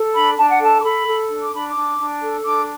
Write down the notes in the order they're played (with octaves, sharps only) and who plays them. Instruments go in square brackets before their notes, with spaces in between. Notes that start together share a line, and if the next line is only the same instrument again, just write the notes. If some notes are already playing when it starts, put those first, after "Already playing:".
Already playing: [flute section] A4
D4 B5
D4 A5
F#5
A4 A5
D6
A4 B5
A4
D4
D6
D4 B5
D6
D4
D4
A4
D4 D6